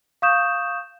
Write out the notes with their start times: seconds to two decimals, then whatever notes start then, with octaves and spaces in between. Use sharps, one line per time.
0.22 F5 C#6 D#6 G6 E7